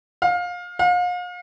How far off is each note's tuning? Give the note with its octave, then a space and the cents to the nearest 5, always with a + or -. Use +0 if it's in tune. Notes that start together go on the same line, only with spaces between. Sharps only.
F5 +25
F5 +40